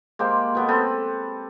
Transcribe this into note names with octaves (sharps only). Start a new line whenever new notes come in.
G#3 A#3 G4 C5
B2 B3 A4
C4 A4 B4